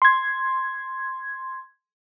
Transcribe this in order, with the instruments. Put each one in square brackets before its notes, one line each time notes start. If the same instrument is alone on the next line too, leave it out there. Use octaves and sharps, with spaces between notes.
[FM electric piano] C6 G#6